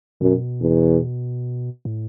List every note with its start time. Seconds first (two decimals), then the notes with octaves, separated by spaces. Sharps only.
0.21 F#2 B2
0.61 E2
1.85 A2